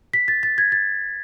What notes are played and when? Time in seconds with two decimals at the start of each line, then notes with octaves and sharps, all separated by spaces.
0.13 B6
0.28 A6
0.43 A6
0.58 G#6
0.72 A6